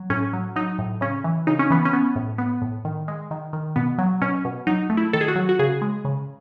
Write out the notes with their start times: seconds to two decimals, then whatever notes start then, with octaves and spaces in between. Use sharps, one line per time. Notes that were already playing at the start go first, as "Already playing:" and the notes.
Already playing: F#3
0.10 A2 C#4
0.33 F#3
0.56 F#3 D#4
0.79 A2
1.01 C#3 C#4
1.24 E3
1.47 C#3 D#4
1.59 C#4
1.70 E3 B3
1.85 C#4
1.93 B3
2.16 A2
2.38 B3
2.62 A2
2.85 D#3
3.08 G#3
3.31 D#3
3.53 D#3
3.76 B2 B3
3.98 F#3
4.21 B2 C#4
4.45 B2
4.67 F#3 D#4
4.90 A3
4.97 E4
5.13 D#3 A4
5.21 G#4
5.28 F#4
5.35 F#3
5.49 F#4
5.59 C#3 G#4
5.82 G#3
6.05 C#3